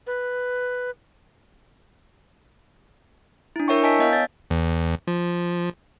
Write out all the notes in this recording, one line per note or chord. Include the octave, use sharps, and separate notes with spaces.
B4
D4 E4
E4 A#4 C#5 E5 G5 C#6
D#5 G#5 A5 E6 B6 D7
B3 D#5 F5 G6
C#5 A6
E2
F3